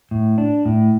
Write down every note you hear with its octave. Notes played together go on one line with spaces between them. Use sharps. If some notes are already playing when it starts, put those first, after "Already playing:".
A2
D4
A2